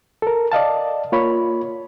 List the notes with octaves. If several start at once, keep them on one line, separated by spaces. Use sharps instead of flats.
A4 A#4
D5 D#5 F5 A5
A#3 F4 C#5 B5